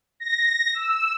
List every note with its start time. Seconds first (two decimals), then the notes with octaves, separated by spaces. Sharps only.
0.20 A#6
0.74 E6